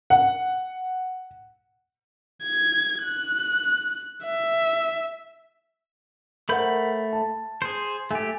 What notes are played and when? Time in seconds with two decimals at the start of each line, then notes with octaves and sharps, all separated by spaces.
0.10 F#5
2.44 G#6
3.04 F#6
4.25 E5
6.49 A3 A#4 C5 F#5 B5 G6
7.13 A5
7.62 G#4 C5
8.11 A3 G4 G#5